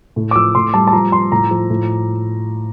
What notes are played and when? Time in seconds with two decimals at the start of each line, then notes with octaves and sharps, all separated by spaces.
0.16 A2
0.31 D6
0.36 F3 E6
0.55 A2 C6
0.74 G3 A5
0.87 A5
0.93 F3 A#5
1.12 F3 C6
1.32 A2 A#5
1.51 F3
1.70 A2